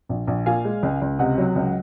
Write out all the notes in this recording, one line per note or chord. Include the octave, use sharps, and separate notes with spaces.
A#1
A#1
A#2 F5 G#5
G#3
C#2
C#2
C3 D#5 F#5
F#3
C#2